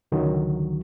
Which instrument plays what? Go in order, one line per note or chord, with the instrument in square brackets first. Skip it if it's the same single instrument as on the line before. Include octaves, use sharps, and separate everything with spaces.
[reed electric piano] C#2 D3 D#3 F#3